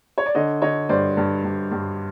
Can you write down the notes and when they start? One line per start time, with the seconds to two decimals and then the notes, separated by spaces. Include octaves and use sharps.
0.18 C#5
0.26 D5
0.35 D3 C#5 D#5
0.62 D3 C#5 D#5
0.89 G2 C5 D5
1.17 G2
1.44 G2
1.71 G2